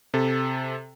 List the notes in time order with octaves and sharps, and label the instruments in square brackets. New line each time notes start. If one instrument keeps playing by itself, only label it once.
[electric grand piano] C3 A4